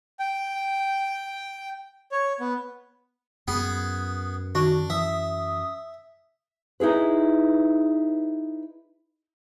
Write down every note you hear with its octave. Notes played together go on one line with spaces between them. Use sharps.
G5
C#5
B3
F#2 B3 G#4
D#3 D4 F#4
E3 E5 D#6
D#4 E4 G#4 B4